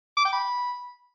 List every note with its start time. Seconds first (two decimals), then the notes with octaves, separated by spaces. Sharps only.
0.17 D6
0.25 G5
0.33 B5